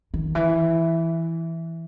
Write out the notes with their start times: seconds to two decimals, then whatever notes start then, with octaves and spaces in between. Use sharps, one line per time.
0.14 D#3
0.35 E3